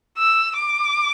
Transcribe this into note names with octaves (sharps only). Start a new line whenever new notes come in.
E6
D6